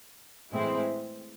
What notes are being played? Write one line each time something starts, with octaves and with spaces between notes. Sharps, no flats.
A2 E3 G#3 C4 E4